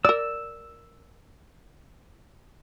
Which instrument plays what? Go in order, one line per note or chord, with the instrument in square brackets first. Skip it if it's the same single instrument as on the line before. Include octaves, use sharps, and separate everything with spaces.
[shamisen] A#4 D5 [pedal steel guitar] E6